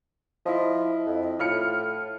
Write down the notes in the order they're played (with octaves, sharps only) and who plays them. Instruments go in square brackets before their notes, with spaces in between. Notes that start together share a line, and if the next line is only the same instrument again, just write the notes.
[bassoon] F3 [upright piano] E4 D#5
[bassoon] F2
[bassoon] A2 [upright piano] F4 F6 C#7